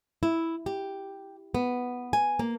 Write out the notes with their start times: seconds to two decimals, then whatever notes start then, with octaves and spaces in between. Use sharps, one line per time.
0.23 E4
0.66 G4
1.55 B3
2.13 G#5
2.39 A#3